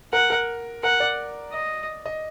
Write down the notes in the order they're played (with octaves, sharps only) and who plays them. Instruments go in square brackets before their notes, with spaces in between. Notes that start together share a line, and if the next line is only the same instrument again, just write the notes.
[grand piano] A#4 [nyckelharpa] F#5
[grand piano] A#4
[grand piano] A#4 [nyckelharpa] F#5
[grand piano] D5
[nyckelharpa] D#5
[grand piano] D#5